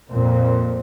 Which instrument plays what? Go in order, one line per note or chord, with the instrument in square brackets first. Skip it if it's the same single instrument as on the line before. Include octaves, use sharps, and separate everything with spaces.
[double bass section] F2 A#2 A#3 C4